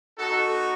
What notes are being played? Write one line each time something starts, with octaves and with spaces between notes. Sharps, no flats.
B3 D#4 F#4 A4